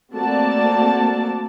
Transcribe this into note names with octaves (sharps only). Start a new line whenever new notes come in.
A3 A#3 C4 F#4 D5 A5